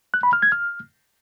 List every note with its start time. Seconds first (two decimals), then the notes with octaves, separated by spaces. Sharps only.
0.14 F#6
0.23 B5
0.33 F6
0.42 G#6
0.52 F6